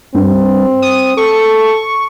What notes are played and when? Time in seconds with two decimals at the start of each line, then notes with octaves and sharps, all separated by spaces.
0.15 G2 C4
0.82 D#6
1.17 A4 C#6